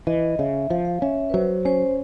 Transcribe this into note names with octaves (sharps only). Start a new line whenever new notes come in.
E3 D#5
C#3 E5
F3 F5
F5
C#4 E5
B4
F#3 C5
C#4 C5